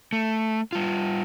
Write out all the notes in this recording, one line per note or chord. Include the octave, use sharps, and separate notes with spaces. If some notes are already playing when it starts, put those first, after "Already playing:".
A3
G3 F4